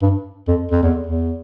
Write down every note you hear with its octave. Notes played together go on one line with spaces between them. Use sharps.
G2
F2
F2
E2
E2